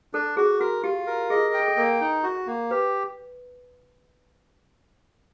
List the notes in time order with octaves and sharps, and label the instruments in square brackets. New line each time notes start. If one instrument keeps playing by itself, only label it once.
[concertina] D4 [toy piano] A4
[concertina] F#4 [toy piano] G#4
[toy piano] F#4 [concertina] A#4
[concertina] F4 [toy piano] G4
[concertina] A#4
[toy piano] G#4 [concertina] D#5
[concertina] G5
[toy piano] G#4
A4
[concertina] A#3 [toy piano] A#4
[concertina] D#4
F#4
A#3
[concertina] G4 [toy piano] B4